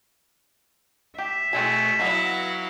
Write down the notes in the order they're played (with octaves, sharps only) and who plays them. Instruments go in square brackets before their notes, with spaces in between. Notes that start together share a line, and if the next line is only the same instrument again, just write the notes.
[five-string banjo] G4 [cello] E5
[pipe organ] B2 A3 A4 [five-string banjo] E3 C4 G#5 [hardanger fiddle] G#3
[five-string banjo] E3 B3 D#5 [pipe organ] F#3 F5 [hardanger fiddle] E4 F#4